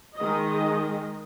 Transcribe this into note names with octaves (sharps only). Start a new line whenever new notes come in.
D#3 G#3 D#5